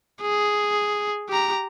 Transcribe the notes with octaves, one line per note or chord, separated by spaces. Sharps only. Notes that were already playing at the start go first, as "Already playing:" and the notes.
G#4
G4 A#5